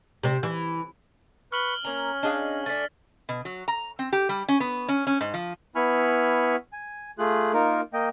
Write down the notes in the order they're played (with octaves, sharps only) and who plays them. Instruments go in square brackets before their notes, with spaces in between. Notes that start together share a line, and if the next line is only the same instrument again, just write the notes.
[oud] C3 C4
E3
[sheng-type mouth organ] B4 C#6 [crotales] F6 F#7 G7
[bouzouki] A#3 A#5 [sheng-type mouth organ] C#4
[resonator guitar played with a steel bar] D4 G#4 F5 [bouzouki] D#5
[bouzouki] A3 D4 [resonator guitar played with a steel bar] G#5 [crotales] A6 B6
[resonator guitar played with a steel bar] B2
F#3
A#5
C4
G4
G3
C#4
B3
C#4
C#4
G#2
F3
[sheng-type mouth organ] B3 E4 G#5 B5 C#6 F6
G#5
A3 F4 G#4 F#6
A#3 D#4 F4 A#4
A#3 D#5 G5